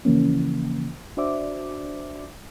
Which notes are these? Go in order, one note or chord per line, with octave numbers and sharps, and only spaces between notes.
C#3 E3 F3 A#3 C#4
D4 F#4 C5 D5 E5 D6